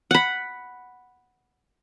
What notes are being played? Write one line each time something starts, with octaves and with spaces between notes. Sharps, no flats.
F#5 B5